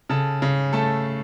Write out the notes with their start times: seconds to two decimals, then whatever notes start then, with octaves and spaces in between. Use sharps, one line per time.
0.09 C#3 A4 A5
0.42 C#3
0.73 A3 A4 A5